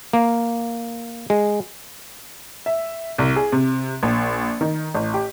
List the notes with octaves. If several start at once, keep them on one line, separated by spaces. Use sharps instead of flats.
A#3
G#3
E5
C2
G#4
C3
A#1
D#3
A1
G4